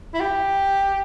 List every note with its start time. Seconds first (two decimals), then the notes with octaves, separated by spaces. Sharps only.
0.14 E4
0.20 G4